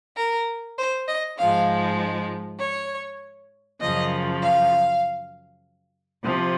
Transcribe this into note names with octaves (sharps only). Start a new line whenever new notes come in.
A#4
C5
D#5
G#2 F3 G#3 F5
C#5
F#2 C#3 F3 D#5
F5
C3 F3